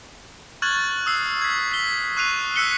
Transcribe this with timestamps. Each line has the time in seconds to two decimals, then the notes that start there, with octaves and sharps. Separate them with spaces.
0.62 C#6 F6 F#6 G#6 A6 F#7
1.06 D#6 E6 C7
1.42 G#6 B6
1.72 B6 G7
2.17 C#6 F#6 C7 D#7 F7
2.56 E6 F#6 B6 C#7 G7